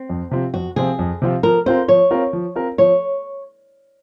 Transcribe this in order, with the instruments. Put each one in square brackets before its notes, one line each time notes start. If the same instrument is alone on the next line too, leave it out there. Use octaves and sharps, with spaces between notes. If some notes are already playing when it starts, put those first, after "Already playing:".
Already playing: [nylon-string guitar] C4
[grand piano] F2
C3 F3 C4 F4
[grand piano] F2 [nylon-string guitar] F#4
[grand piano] C3 F3 C4 F4 [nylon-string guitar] G#4
[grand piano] F2
C3 F3 C4 F4
[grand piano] F3 [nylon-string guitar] A#4
[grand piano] C4 F4 A#4 [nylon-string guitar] C5
[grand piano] F3 [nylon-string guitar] C#5
[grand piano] C4 F4 A#4
F3
C4 F4 A#4
[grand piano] F3 [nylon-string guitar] C#5